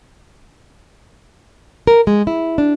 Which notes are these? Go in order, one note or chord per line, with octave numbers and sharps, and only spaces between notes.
A#4
G#3
E4
D4